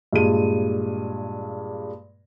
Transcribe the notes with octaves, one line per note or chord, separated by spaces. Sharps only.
G2 A#2 G#3 D#7